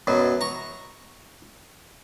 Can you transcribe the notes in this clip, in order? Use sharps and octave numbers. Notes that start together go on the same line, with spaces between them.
F#2 B2 F#3
A#5 C#6